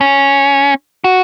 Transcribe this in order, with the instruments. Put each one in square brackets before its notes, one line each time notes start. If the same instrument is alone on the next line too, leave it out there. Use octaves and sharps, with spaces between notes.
[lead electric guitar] C#4
F#4